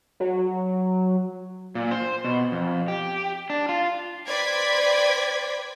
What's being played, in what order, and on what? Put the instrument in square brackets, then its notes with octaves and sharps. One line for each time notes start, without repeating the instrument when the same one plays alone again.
[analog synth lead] F#3
[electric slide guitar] A#2
C5
B2
F2
G4
D4
F4
[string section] B4 C5 D5 G5 G#6 B6